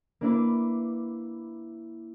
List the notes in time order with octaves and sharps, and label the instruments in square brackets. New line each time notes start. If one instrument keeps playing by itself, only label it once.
[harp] A#3 D4 E4 B4